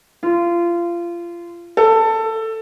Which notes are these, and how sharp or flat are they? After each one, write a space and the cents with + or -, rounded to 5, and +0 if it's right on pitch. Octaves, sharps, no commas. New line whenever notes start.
F4 -25
A4 +15